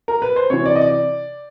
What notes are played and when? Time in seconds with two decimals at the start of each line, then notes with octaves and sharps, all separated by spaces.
0.08 A#4
0.22 B4
0.36 C5
0.50 C3 E3 C#5
0.66 D5
0.75 D#5
0.81 D5